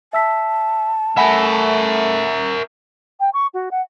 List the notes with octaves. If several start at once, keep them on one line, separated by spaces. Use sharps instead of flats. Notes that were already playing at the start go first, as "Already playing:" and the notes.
E5 A5 E6 B6
A3 A#4 E5 F#5 G#5 B5
G5
C#6
F#4
F#5